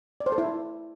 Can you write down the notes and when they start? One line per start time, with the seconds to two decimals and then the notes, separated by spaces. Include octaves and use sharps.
0.20 D5
0.26 C5
0.32 A4
0.38 E4